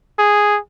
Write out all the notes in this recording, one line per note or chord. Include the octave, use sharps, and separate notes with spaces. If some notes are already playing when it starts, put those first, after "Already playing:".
G#4